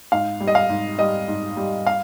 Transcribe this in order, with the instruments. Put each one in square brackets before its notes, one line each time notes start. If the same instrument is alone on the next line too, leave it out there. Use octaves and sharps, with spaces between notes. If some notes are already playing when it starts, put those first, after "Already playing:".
[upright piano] G#2 F5
G3
D#5
F5
G#2
G3 D#5
G#2
G3
F5